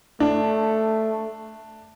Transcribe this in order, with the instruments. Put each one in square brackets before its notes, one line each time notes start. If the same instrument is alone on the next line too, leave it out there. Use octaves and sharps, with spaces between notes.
[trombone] A3 [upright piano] D4